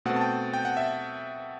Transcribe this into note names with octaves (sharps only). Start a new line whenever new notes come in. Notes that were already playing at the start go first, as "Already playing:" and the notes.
B2 A3 C4 F#5
A5
G5
G5
F#5
E5